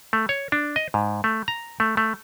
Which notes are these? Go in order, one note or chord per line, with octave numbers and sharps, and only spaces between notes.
A3
C#5
D4
D#5
G#2
A3
A#5
A3
A3